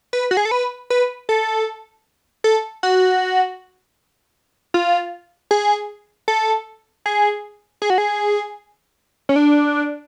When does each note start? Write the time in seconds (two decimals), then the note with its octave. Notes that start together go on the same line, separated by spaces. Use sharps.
0.13 B4
0.31 F#4
0.37 G#4
0.45 A4
0.51 B4
0.90 B4
1.29 A4
2.44 A4
2.83 F#4
4.74 F4
5.51 G#4
6.28 A4
7.06 G#4
7.82 G#4
7.90 F#4
7.98 G#4
9.29 C#4
9.36 D4